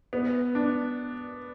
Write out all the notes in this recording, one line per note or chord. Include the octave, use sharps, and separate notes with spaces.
B3
D4